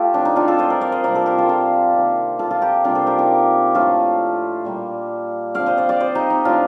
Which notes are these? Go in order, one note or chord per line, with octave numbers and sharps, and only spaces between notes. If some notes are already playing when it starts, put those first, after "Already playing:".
Already playing: A3 F4 G4 A4
A2 F3 C4 D4
D#4
D4 F4
F4 A4
C5 D#5
A#4 D5
D5 F5
C5 D#5
C3 G3 A#3 D4 A#4 D5
A4 C5
G4 A#4
F4 A4
F4 A4
C3 D#3 A#3
F4 A4
F4 A4
G4 A#4
C3 G3 A#3 D4 F4
A4 C5
G4 A#4
D#4 G4
A2 F3 A3 D4 F4 A4
A#2 G3 A#3
D3 F3 C4 D5 F5
C5 D#5
D5 F5
D5 F5
C5 D#5
D#4 G4
D#4
A2 F3 A3 D4 F4